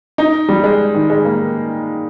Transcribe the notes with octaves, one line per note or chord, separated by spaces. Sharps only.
D#4
G3
G#3
D#3
G#3
A#3